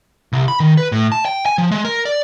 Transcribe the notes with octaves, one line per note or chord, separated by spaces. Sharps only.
C2
B5
D#3
B4
A2
A5
G5
G#5
F3
G#3
A#4
D5